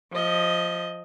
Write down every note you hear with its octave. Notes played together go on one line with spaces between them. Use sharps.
F3 D#5